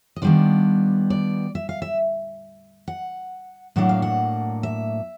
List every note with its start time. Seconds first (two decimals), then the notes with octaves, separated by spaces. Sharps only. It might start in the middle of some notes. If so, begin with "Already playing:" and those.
0.16 D#5
0.22 D#3 G3 B3 D4 F4 D5
1.10 D5
1.55 E5
1.69 F5
1.82 E5
2.88 F#5
3.76 A2 F#3 A#3 D4 F#5
3.89 F5
4.02 F#5
4.63 E5